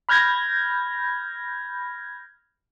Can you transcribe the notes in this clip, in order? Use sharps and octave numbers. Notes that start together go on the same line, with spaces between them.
B5 F6 G6 G#6 A#6